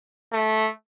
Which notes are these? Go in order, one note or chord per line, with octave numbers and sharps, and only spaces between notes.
A3